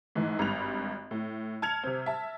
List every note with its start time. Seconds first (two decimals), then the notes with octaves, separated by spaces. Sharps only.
0.16 G#2 E3 A3
0.39 G#1 G2 F7
1.11 A2
1.62 A5 F6 G#6 C#7 F7
1.83 C3 C4
2.06 E5 A5